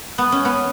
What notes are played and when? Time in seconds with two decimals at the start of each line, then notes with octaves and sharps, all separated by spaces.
0.18 B3
0.32 C#4
0.45 B3